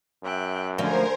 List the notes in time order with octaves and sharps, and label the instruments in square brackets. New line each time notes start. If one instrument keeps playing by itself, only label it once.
[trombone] F#2 [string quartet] E5 G5 F#6
[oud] D2 F3 A#3 [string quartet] D3 G3 G#5 [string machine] A#4 C5